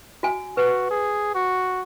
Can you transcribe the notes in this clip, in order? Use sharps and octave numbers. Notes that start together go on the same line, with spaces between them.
F#4 G#5
F#4 B4
G#4
F#4